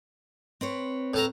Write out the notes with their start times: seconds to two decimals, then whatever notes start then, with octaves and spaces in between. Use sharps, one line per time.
0.61 C4 B4 C#5
1.14 A2 A4 A#5